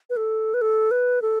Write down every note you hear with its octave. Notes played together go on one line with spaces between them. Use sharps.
B4
A4
B4
A4
B4
A4